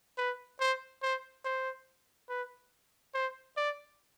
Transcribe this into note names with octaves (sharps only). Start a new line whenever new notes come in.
B4
C5
C5
C5
B4
C5
D5